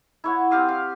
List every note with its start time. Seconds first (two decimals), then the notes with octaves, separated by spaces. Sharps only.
0.24 E4 C#5 F#5
0.51 C4 G4 F5 D#6
0.69 F5